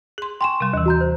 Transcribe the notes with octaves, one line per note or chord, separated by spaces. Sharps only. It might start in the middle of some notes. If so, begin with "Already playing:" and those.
G#4 C6
G5 G#5 C6 C#6 E7
C3 G3
D#2 E3
F#4 A#5 G6
C5